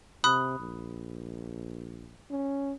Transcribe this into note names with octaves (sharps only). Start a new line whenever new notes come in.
C3 B5 D#6 F#6
A#1
C#4